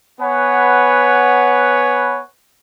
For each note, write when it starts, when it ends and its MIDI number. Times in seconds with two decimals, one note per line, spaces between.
0.20 2.21 59
0.20 2.21 71
0.20 2.21 73
0.20 2.21 78
0.20 2.21 80